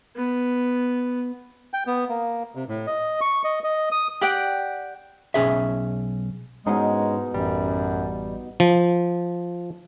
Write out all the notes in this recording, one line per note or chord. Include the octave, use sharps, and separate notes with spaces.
B3
G5
B3
A#3
C3
A2
D#5
C#6
D#5
D#5
D#6
G4 D5 F#5 G5
B1 C#4 G#4 E5
G#2 B2 G#3 C#4 D#4 G#4
A1 F#2 G3
F3